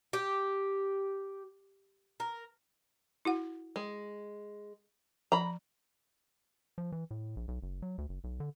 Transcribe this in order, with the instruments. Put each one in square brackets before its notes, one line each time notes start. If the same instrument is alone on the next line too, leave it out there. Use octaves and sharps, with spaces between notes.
[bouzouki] G4
A#4
[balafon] E4 F#4 F#5
[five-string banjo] G#3
[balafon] F3 [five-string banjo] A#5 B5
[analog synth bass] F3
E3
A2
A#1
B1
F#1
F#3
D2
F#1
B1
D3